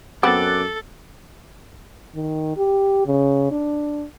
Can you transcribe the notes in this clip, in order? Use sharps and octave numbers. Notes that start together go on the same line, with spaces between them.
F#2 B3 C4 A4 D6 F#6 A6
D#3
G4
C#3
D4